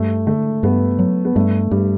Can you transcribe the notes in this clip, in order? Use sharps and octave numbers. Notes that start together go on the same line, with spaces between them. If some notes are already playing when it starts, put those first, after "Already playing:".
Already playing: G2 A3
D3 A3
G2 B3
F#3
B3
G2 A3
G2 G3